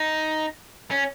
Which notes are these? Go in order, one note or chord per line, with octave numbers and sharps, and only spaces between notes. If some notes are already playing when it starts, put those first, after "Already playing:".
Already playing: D#4
C#4